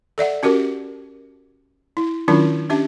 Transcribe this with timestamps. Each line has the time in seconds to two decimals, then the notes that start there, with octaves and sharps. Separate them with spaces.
0.18 A4 D5 E5 F#5
0.43 C#4 F#4 G4 A#4
1.97 E4
2.28 D#3 F#3 C#4 D4 E4 F4
2.70 C#4 D4 G4 E5